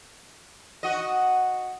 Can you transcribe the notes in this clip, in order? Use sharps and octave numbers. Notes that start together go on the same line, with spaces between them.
F#4 D#5